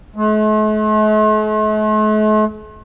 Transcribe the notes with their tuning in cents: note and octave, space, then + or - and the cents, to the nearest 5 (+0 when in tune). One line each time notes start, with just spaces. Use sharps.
A3 -45